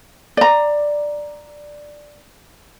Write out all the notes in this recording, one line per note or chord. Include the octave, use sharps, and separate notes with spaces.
D5 A#5